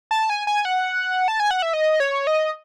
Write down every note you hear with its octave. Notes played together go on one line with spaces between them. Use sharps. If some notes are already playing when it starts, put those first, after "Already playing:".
A5
G#5
G#5
F#5
A5
G#5
F#5
E5
D#5
C#5
D#5